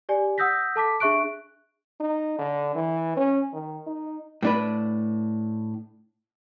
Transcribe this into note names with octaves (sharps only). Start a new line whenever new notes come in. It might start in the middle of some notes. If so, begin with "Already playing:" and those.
G4 D5 G#5
F#5 D#6 E6 G6 A#6 B6
A4 A5 D6 B6
D4 G#4 E5 C#6 F#6 D7
D#4
D3
E3
C#4
D#3
D#4
A2 D4 B4